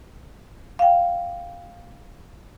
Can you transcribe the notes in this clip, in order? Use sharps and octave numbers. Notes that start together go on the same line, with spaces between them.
F5 G5